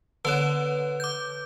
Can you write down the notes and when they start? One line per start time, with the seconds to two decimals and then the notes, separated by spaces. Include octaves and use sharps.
0.25 D3 B3 B4 C#5
1.00 D6 G6